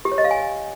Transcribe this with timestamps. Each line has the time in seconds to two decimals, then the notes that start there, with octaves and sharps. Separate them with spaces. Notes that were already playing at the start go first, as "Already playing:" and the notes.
0.05 G4
0.12 C#5
0.18 D#5
0.24 F5
0.31 G#5